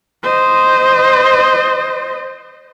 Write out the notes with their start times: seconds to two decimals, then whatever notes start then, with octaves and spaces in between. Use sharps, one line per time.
0.23 C5 D#5